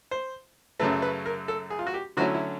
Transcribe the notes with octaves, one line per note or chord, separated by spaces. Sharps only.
C5
F#2 C#3 F#3 A3 B4
B4
A#4
A4
G#4
F4
F#4
G4
D3 F#3 A3 C#4 E4 F#4
E4